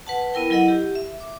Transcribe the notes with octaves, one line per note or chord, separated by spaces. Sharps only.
B4 F#5 A5
B3 E4 A#4 G5
F#3 E4 A4 D#5 F#5
G4
E5
D6